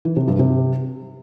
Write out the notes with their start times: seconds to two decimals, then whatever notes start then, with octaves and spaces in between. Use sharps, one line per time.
0.05 E3
0.16 C3
0.28 G2
0.39 C3